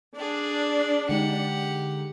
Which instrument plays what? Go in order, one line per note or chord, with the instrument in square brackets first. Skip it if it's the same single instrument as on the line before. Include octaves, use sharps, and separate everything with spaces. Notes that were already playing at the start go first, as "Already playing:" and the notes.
[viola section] D4 [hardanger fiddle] G#4 D5
[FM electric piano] D3 G#3 D#4 [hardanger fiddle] G4 F#5